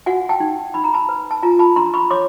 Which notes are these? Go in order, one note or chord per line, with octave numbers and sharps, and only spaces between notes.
F#4 F#5 G#5
G5 A5
D#4
D#4 B5
A#5
A5 B5
B4
A5
F4 G#5 A#5
A5 B5
D4 A#5 C6
B5 C#6
C#5 C6 D6